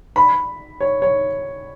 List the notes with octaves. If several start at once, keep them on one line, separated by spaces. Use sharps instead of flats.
B5
C#5
C#5